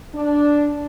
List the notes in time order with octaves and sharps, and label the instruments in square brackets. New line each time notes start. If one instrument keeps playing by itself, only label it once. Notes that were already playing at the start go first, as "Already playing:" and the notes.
[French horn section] D4